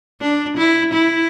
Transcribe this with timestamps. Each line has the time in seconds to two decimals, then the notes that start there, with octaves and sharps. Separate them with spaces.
0.21 D4
0.57 E4
0.93 E4